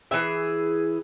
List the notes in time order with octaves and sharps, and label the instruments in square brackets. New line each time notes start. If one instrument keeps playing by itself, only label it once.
[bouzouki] E3 G#4 E5